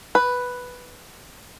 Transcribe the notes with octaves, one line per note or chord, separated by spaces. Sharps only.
B4